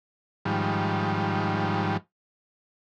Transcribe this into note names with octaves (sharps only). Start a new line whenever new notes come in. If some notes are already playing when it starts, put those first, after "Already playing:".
G#2 D#3 F3 G3